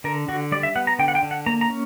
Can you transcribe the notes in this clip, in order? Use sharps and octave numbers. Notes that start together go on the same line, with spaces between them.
D3 A#4
D3 F#4
G3 D5
E5
B3 F#5
A#5
D3 G5
F#5
G5
D3
F#5
A#3 A#5
A#5
C#4